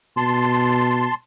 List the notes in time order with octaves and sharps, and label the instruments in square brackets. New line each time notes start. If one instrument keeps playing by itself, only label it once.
[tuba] B2 [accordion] A5 C6